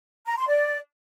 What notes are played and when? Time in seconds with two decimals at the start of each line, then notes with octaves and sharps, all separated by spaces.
0.27 A#5
0.38 C6
0.48 D5